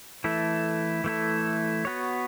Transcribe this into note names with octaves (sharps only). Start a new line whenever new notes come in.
E3 A3 E4 A4
E3 A3 E4 A4
B3 F#4 C#5